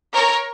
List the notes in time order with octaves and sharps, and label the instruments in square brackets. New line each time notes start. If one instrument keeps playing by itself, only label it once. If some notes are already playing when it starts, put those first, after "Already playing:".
[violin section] A#4 C#5